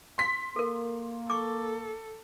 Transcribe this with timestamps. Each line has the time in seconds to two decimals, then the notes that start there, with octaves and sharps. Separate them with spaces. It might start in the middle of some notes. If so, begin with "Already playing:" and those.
0.18 C6 B6
0.56 A#3 A4 A#4
1.30 A4 C#6 D6